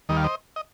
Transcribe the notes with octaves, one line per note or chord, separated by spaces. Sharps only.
D#2 D#3 G3 D#5
F5
C5 D#5
D#5